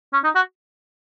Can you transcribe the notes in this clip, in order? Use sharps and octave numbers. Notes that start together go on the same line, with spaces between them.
C#4
D#4
F#4